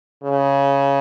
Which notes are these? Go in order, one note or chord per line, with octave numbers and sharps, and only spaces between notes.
C#3